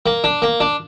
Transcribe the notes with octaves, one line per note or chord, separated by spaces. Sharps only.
A#3
D4
A#3
D4